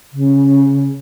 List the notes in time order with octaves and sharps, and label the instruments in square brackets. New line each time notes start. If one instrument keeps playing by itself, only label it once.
[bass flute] C#3